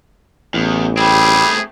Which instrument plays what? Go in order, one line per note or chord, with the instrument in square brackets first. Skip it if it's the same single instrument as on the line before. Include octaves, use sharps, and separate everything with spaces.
[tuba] A1 [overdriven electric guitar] E2
[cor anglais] G3 [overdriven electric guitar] A3 C4 [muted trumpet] G#4